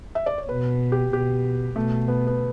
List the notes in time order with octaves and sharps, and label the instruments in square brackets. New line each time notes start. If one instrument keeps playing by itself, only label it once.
[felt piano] E5
D5
C#5
[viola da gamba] B2 [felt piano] B4
[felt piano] G4
[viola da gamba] B2 [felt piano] G4
[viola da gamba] B2 [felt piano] A3
[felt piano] B3
B3